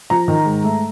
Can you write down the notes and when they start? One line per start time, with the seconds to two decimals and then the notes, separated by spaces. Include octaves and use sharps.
0.10 F3 A#5
0.28 D#3
0.46 G#2
0.64 A3